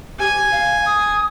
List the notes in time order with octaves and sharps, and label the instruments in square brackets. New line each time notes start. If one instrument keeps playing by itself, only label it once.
[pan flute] G4 [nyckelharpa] G#5
[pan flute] F5
D#6